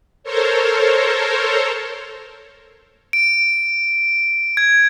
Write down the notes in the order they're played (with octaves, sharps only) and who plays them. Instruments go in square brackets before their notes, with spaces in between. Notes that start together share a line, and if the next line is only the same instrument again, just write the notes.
[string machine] A4 A#4 C5 C#5
[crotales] D7
G#6